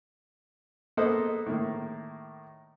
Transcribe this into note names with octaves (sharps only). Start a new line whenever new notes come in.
A#3 B3 A4 C5 D#5 F#5
A2 D#3 A#3